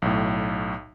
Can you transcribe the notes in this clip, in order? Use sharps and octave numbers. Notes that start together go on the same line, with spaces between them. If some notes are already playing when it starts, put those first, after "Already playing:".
B1 A2